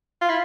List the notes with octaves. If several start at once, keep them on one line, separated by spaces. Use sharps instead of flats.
F4
E4